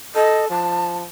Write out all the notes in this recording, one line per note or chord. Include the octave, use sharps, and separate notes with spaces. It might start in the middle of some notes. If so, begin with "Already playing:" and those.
A4 D#5
F3 A5